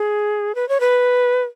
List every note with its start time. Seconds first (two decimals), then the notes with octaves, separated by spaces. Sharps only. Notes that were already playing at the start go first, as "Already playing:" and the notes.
Already playing: G#4
0.55 B4
0.69 C#5
0.80 B4